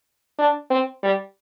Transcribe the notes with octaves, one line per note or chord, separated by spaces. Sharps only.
D4
C4
G3